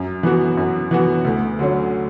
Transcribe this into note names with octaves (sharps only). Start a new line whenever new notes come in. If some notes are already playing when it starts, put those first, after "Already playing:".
Already playing: F#2
E3 B3 F#4
F#2
E3 B3 F#4
D2
D3 F#3 C#4